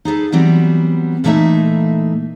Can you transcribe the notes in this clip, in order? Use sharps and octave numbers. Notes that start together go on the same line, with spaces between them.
D#4 G#4 A4 B4
E3 F#3 G3 B3 C4 F#4
A#2 E3 A3 A#3 D#4 E5